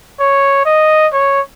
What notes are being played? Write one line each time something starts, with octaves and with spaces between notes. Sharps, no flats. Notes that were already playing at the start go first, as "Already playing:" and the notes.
C#5
D#5
C#5